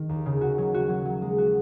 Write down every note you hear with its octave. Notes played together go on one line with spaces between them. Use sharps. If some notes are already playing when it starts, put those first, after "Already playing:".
Already playing: D#3
D#2
C#3
F#4
F#3
F#4
F#3
F#3
G#3
F#4